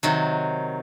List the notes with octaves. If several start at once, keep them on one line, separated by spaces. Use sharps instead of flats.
C3 D#3 F#3